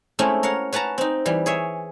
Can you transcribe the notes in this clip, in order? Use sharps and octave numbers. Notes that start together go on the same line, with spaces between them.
G#3 A3 C4 C#4 E4
A#4 C#5 F5 F#5
C#4 B4 F#5 A5 A#5
C4 D#4
E3 G3
G#4 C#5 E5